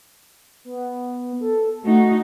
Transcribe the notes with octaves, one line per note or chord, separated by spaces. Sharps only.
B3
A4
A3 D#4 F#4